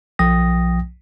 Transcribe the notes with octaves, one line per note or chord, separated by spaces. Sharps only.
B1 F3 G5 D#6 A#6